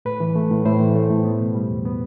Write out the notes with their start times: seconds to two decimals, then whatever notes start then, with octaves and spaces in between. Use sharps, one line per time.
0.05 A2 B4
0.20 E3
0.35 A3
0.51 A2
0.65 A2 C5
0.80 E3
0.95 A3
1.10 A2
1.24 B3
1.40 B2
1.55 G3
1.70 E2
1.85 B3